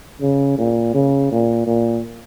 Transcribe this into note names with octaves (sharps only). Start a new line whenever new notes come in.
C#3
A#2
C#3
A#2
A#2